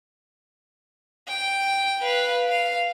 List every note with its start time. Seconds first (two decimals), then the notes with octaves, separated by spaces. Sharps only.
1.28 G5
2.02 B4 F5
2.48 F5